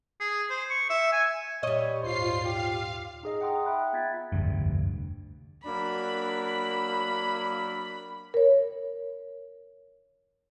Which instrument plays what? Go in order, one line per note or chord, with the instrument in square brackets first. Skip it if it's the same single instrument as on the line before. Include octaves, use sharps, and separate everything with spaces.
[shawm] G#4
C5
C#6
E5
G#5
[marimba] A#2 [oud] G3 D#5 [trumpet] C#5
[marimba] D#2 G#2 [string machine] F4 C7 [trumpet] C5
[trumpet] G4 [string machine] F5
[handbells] D#4 G#4 D#5
F#5 G5 A#5 C6 D#6
E5 G5 A5 B5 F#6
B3 F4 G#6 A6 B6
[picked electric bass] F1 D2 G2
[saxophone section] F#3 A#3 D4 [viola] B5
[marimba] A#4 C#5